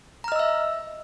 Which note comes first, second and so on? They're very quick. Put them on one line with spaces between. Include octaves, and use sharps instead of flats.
A#5 F6 D#5 E6 E5